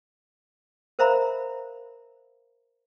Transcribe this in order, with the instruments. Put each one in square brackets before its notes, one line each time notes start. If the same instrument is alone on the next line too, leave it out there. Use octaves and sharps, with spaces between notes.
[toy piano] A#4 C5 E5 F5 A#5 B5